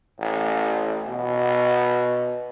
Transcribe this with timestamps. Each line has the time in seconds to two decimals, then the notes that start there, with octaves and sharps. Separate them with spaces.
0.19 A1
1.08 B2